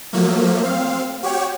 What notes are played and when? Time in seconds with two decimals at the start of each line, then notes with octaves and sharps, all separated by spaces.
0.13 F3 F#3 A3 A#3
0.63 C4 F5
1.23 F#4 G4 C#5 G5